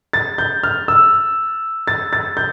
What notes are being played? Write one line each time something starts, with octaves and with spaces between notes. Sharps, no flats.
A6
G6
F6
E6
A6
A6
G6